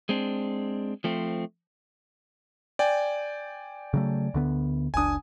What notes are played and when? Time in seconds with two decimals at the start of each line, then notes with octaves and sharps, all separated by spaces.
0.09 G#3 C4 D4
1.04 F3 A3 C4
2.79 D5 G5 G#5
3.94 C#3 F#3 A3
4.34 D2 D3 B3
4.94 F#1 C#2 D4 G#5 D#6